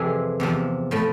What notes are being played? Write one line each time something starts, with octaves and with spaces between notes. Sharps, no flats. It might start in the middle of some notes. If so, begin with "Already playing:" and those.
Already playing: F2 C3 E3 G#4
E2 C3 F3
A2 F3